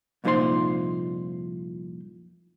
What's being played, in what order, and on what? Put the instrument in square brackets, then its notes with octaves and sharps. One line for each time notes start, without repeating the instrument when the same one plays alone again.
[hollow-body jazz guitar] C2 F2 A#2 D#4 C5 C6